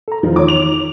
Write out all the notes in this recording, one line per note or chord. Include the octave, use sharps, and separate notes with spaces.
A4 A#5
E2 D#3 F3 D#4 F4
C#5 D6
F7